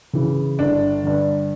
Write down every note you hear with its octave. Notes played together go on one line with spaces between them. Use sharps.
C#3 E3
G1 D4
G2 D3